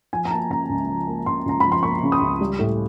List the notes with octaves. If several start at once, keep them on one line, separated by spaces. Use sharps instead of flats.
F3 G#5
A#5
A#3 A5
C#3 A#5
C#2
F3
A#3
C#3 C6
C#2 A#5
F3 B5
C6
A#3 C#6
C#3
D#6
C#2
G3
A2